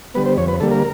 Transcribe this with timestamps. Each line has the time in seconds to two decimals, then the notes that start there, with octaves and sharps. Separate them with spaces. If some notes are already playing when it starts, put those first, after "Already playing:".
0.14 D3 G3 B3 B4
0.25 C5
0.37 F2 C#5
0.48 B4
0.61 D3 G3 A#3 A4
0.72 A#4